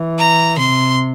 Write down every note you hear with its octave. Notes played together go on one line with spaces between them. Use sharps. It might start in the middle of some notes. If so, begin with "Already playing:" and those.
Already playing: E3
A#5
C3 C6